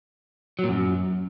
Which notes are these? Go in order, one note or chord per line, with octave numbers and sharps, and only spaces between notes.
F#3
A#2
F#2